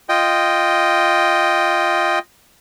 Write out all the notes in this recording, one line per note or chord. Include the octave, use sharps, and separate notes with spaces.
F4 D#5 G5